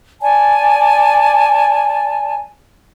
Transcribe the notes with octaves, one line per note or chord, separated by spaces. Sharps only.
D5 G#5 A5